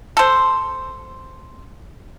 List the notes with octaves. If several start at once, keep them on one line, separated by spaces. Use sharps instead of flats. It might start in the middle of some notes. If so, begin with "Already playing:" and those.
A4 C5